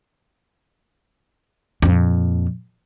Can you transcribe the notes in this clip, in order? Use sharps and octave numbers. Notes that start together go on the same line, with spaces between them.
F2 A#2